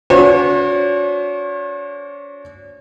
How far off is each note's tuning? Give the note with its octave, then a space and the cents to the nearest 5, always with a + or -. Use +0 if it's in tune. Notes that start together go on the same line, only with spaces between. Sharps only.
C#4 +45 F#4 -30 C#5 -45